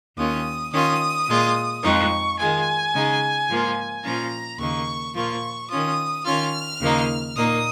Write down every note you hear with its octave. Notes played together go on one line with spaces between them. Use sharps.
D#2 D#3 C#4 F4 D#6
D#3 C#4 F4 D#6
A#2 G#3 F4
F2 F3 G#3 D#4 C#6
D#3 G#3 F4 G#5
C#3 G#3 D#4
G#2 F3 A#3 F4
A#2 F3 C#4 F4 A#5
D#2 C#3 A#3 D#4 C#6
A#2 F3 A#3 F4 C#6
D#3 C#4 F4 D#6
D#3 C#4 F4 F6
D#2 C#3 F3 A#3 D#4
A#2 A#3 D#4 D#6